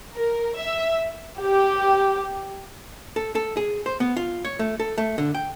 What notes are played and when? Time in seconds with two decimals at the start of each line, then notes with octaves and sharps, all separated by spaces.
0.15 A#4
0.57 E5
1.39 G4
3.16 A4
3.35 A4
3.57 G#4
3.86 C5
4.00 B3
4.16 F4
4.45 C#5
4.59 A3
4.80 A4
4.98 A3
5.18 D3
5.35 G5